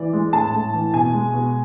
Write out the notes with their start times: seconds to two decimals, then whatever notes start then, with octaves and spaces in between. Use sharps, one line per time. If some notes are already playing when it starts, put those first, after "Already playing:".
Already playing: E3 D5
0.13 G#3
0.33 A2 A5
0.53 A2
0.74 E3
0.94 B2 G#5
1.14 G#3
1.33 B2